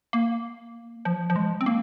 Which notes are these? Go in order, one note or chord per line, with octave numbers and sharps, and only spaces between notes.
A#3
F3
F3
G#3
C4
A#3